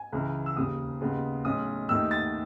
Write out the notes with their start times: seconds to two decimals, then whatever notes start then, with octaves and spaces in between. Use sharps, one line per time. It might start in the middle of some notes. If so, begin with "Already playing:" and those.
Already playing: G#5
0.12 C#2 C#3 E3
0.46 E6
0.56 E1 D#2 C#3 D#6
1.01 D#2 C#3 G#3 B3
1.45 B1 A2 G#3 C#4 D#6
1.89 D#2 D#3 A3 D#4 E6
2.11 A6